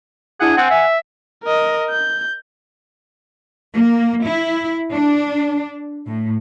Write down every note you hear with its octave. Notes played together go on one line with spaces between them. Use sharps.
D4 E4 G#4 F#5
C4 F#5 G#5
E5
A#4 D#5
G6
A#3
E4
D4
A2